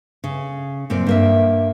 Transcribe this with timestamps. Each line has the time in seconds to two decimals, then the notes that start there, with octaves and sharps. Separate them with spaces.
0.24 C#3
0.90 F#2 A#2 C4 D5
1.06 G2 A#3 E5